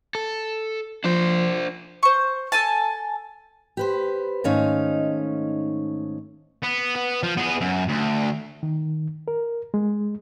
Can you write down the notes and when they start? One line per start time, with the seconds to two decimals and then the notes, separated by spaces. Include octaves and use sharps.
0.15 A4
1.04 F3 D4 C5
2.03 C5 C#6
2.52 A4 G#5 A5
3.77 G4 B4 C5
4.44 G#2 D#3 A3 C#4 D#4 F5
6.63 B3
6.96 B3
7.23 F3
7.37 B3 G#4
7.61 F#2
7.88 D2
8.63 D#3
9.28 A#4
9.74 G#3